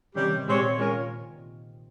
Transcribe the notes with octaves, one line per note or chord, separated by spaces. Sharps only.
C3 D#3 G3 C#4 G4
D#3
C3
A#2 G#3 C4 G4 C#5
G#3 C#4 F4 A#4 C#5